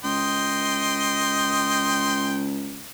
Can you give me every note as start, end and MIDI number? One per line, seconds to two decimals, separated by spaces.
0.04 2.86 37
0.04 2.46 75
0.04 2.46 79
0.04 2.46 84